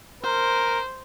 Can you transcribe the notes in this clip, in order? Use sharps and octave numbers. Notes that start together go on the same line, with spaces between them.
A#4 C5